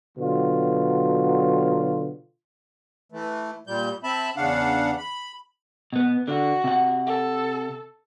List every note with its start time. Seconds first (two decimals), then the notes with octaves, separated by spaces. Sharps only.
0.18 B2 D3 F#3 F4
3.12 E3 A3
3.67 A#2 G3 G6
4.04 C4 E5 A5 B5
4.37 E2 C#3 D4 F5 F#5
4.98 B5
5.93 B2 B3
6.28 D3 F#4
6.64 C3 F#5
7.06 A4